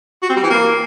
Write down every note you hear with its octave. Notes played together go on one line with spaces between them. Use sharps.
F#4
C4
G3
E3
A#3